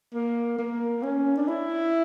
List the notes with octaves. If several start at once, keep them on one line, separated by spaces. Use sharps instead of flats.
A#3
A#3
C#4
D4
E4